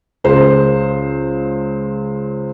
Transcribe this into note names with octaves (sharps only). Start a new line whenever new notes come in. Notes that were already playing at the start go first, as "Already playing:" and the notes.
C#2 G#4 C5